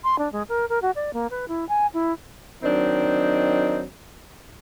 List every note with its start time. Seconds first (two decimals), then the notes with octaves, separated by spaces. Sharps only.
0.04 C6
0.19 D4
0.32 G#3
0.49 A#4
0.69 A#4
0.82 F#4
0.96 D5
1.13 A#3
1.30 B4
1.48 E4
1.69 G#5
1.94 E4
2.63 D#3 F#3 C4 D4 D#4